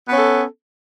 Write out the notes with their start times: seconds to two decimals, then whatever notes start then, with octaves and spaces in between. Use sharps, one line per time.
0.08 B3
0.13 C#4
0.18 A4